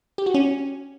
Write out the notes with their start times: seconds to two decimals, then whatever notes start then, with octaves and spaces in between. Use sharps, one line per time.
0.18 G4
0.26 F#4
0.34 C#4